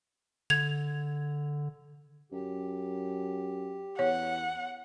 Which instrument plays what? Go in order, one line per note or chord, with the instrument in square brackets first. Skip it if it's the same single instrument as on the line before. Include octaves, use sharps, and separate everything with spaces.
[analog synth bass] D3 [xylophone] G#6 F7
[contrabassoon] F#2 [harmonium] G4
[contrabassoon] E2 [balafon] C#5 [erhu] F#5